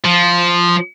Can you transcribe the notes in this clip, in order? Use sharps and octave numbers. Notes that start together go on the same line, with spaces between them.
F3